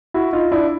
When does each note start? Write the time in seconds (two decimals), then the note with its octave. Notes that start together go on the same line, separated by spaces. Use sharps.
0.14 E4 F#4
0.33 D#4 F4
0.52 D4 E4